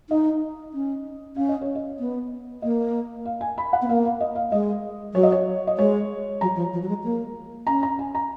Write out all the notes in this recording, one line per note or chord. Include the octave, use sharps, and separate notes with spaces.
D#4 D#5
C#4
C#4 F5
D#5
C#5
D#5
B3
A#3 D#5
F5
G#5
B5
F#5
B3
A#3 F5
F5
D#5
F5
G#3 D#5
F#3 C#5
D#5
C#5
D#5
G#3 C#5
F#3 A#5
F3
F3
F#3
G#3
A#3
C#4 A#5
A#5
G#5
A#5